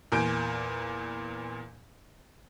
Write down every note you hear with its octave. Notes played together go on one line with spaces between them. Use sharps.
E2 A#2 G#5 G6 D7